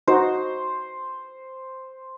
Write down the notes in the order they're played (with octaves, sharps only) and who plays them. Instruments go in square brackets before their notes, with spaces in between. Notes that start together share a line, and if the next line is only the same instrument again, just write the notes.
[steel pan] D#4 F#4 [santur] C5